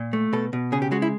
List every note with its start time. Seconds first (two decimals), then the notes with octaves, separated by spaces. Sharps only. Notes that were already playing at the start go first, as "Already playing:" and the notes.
Already playing: A#2
0.13 A3
0.33 B2 A4
0.53 B2
0.72 C#3 G#4
0.82 G4
0.92 G#3 F#4
1.02 E4